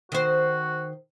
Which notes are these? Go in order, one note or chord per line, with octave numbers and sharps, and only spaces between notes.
D#3 F#4 C5